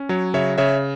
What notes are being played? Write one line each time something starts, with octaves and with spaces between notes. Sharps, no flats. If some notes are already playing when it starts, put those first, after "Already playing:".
Already playing: C#4
F#3 C#5
C#3 C#5 E5
C#3 C#5 E5